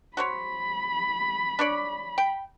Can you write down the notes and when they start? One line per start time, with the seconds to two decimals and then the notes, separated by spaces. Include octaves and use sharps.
0.17 F#4 C5 C#5 B5
1.59 D4 C#5 D5
2.18 G5